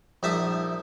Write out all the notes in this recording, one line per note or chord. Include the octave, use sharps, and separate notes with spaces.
A#1 D#4 E5 A5 D#6